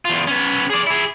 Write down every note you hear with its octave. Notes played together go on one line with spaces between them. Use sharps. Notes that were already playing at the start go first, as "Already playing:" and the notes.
E2 F4
B3 C#4
G#4 D5
E4 G#4